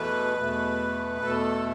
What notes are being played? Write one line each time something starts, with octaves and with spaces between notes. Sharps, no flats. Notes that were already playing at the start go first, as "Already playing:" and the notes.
Already playing: E2 B2 A3 B4
E2 B2 A3
E2 B2 A3 A4